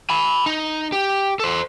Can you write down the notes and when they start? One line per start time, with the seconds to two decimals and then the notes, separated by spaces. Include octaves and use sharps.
0.10 G#5 B5
0.46 D#4
0.92 G4
1.40 A4 C5